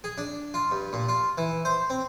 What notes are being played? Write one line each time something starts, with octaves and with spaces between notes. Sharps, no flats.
G#4
D4
F4
G2
A#2
F4
E3
C5
C4